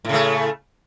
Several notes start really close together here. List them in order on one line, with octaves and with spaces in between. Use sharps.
A2 C#3 A3